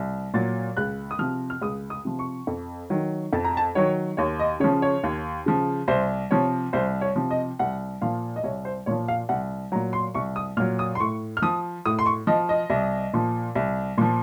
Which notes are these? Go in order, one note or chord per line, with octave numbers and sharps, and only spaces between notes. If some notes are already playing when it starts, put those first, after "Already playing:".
Already playing: C2
A#2 F#3 A6
C#2 F#6
D#6
C3 F3 F6
F6
C#2 D#6
D#6
C3 F3
C#6
F2
D#3 F#3
F2 A5
A#5
A5
D#3 F#3 C#5
D#2 C#5
D#5
C#3 F3 C#5
C#5
D#2
C#3 F3
C2 C5
C3 F3 C#5
C2 C5
C#5
C3 F3
D#5
C2 F#5
A#2 F3 F5
D#5
C2 C#5
C5
A#2 F3 C#5
F5
C2 F#5
A#2 F#3 A#5
C6
C2 C#6
D#6
A#2 F#3 F6
D#6
C6
A2 C#6
F6
F3 D#6
A2 D#6
C6
C#6
F3 D#5
D#5
C2
A#2 F3
C2
A#2 F3